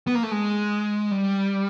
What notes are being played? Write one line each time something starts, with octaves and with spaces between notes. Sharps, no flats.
B3
A#3
A3
G#3
G3